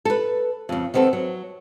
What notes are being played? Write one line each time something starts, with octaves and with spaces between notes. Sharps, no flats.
A4 B4
F2 C#3
D#3 B3 C4 F#4 A4
F#3